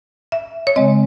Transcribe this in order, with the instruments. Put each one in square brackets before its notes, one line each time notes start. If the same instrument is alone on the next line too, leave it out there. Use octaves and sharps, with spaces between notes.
[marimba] E5
C#5
C#3 G#3 C4 D#5